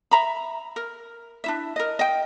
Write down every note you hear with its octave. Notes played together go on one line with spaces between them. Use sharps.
E5 A#5 B5
A#4
D4 E4 E5
A#4 D#5
D#5 G5